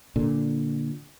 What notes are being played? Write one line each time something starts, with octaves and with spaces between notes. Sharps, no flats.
A#2 D3